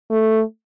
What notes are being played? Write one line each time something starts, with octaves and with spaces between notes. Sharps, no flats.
A3